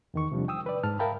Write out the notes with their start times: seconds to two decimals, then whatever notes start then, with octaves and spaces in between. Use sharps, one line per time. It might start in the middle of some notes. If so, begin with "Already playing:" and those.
0.14 E2 D#3 C#6
0.32 C3 F3 G3 D4
0.48 G5 D#6 E6
0.66 B4 D5
0.83 G#2 A5 F6
0.99 A#4 E5 F5 G5 A5 B5